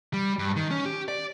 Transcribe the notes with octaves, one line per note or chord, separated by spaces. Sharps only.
G3
G2
D#3
C#4
G4
D5